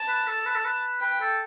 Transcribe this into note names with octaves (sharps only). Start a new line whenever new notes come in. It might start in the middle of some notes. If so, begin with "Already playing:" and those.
Already playing: A5
B4
A4
B4
A4
B4
B4 G5
A4